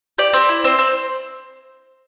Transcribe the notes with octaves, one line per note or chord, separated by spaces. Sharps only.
G4 D5
C4
E4
C4 C5
C4